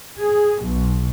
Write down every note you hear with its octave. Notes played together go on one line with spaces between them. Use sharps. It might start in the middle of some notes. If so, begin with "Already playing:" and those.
G#4
B1